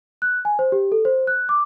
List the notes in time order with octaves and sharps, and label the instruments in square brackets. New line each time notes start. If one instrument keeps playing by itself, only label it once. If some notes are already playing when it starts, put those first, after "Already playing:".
[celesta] F#6
G#5
C5
G4
A4
C5
F#6
D6